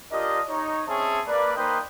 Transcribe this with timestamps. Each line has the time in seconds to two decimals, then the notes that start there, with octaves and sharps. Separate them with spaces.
0.12 D4 F4 G4 A#4 D#5
0.49 D#4 C#5
0.88 C4 C#4 G#4 C#5 E5 A5
1.27 A#3 B4 D5
1.56 A#3 D#4 B4 C5 D#5 G5